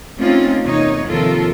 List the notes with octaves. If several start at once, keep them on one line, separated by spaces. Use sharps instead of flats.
A3 A#3 C4 C#4 D#4 F4
E2 C3 A#3 D#4 C#5
D#2 C3 F3 F4 A4 A#4